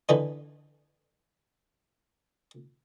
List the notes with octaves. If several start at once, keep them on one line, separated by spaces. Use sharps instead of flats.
D3 E3 D#4